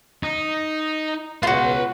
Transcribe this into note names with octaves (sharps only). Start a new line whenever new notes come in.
D#4
C#2 B2 F4 F#4 B4 C6